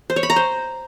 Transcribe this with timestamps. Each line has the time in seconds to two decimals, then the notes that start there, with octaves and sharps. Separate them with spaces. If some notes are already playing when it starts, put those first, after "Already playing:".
0.10 C5
0.16 C#5
0.23 B5
0.30 A#5
0.36 C5